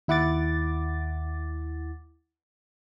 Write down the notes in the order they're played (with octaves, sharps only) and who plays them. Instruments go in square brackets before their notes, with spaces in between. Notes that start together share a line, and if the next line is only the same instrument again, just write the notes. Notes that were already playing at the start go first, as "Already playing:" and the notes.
[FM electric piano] D#2 E4 F#5 D6 A6